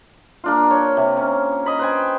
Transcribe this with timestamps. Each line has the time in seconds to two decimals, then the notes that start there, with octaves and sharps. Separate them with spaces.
0.44 A#3 D4 F4
0.70 C#5
0.97 C3
1.17 C#4
1.66 D#5 B5
1.79 B4 C5 G5 G#5